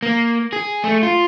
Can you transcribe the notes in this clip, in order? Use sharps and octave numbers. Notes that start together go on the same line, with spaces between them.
A#3
G#4
A3
F4